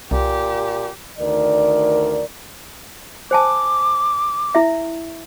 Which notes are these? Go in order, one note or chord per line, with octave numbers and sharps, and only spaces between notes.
C2 A#2 G4
D2 D#3 A#4 D5
C5 G#5 A5 D6
E4 E5